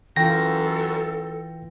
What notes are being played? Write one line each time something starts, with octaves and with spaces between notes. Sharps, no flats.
F#2 E3 F4 A4 G5 A#6